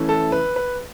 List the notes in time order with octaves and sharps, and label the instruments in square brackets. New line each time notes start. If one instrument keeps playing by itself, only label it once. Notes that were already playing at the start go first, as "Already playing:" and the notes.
Already playing: [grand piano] E3 A3 C#4 E4
A4
B4
B4